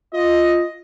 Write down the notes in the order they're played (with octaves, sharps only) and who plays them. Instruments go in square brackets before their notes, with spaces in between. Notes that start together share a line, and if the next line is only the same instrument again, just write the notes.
[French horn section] F4 [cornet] D#5